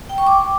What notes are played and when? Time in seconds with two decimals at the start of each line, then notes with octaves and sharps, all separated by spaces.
0.09 G5
0.18 C#6
0.27 D6